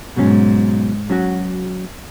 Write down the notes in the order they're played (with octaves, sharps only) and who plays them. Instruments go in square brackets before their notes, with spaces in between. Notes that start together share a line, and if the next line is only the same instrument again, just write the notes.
[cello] G#2 [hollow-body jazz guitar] B2 F#3 C#4
[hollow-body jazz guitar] F#3 C#4 F#4